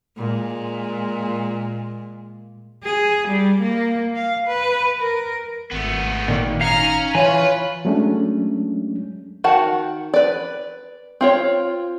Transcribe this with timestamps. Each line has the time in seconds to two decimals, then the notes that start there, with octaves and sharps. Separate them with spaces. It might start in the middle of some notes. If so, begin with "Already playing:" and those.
0.17 A#2 G#3
2.84 G#4
3.27 G3
3.61 A#3
4.16 F5
4.47 B4
4.99 A#4
5.71 G#1 A3 B3
6.28 A#2 D#3 A#3
6.61 C#4 D#4 F5 A#5 F6
7.15 E3 F4 B4 C#5 F5 G#5
7.85 F#3 G#3 A3 C#4 D4
9.44 D#3 F#4 F#5 A5
10.14 B4 D5
11.21 C4 F4 C#5